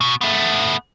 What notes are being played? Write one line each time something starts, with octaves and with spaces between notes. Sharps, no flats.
B2
A3 B3